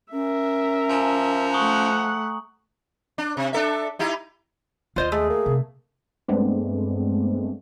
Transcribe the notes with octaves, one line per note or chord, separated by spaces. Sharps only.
C#4 A#4 E5
F3 G#5 A#5
A3 F#5 C#6 D#6 F#7
D4
C3
D4 A4 E5
D#4 E4 G4
D#2 F4 C5 D#5
G#3 A3 G#4
A#3
C3
G2 G#3 A3 B3 C4 D4